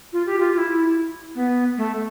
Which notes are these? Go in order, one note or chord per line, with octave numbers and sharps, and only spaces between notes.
F4
G4
F4
F4
E4
B3
A3